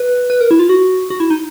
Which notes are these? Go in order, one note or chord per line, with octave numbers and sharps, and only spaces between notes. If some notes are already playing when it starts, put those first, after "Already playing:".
Already playing: B4
B4
A#4
E4
F4
F#4
F#4
E4
D#4